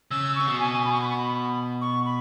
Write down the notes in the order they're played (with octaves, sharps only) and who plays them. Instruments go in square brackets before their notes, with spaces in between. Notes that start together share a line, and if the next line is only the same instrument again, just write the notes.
[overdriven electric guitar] C#3 [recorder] E6
[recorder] C#6
[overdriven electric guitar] C#3
B2
[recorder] G#5
B5
C#6
B5
C#6
B5
C#6
B5